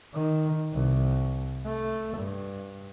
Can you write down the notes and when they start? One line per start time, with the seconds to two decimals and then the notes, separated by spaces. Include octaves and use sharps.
0.14 D#3
0.73 C2
1.65 A3
2.18 G2